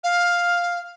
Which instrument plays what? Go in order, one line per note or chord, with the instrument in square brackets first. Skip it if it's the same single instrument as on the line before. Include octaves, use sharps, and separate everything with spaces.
[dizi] F5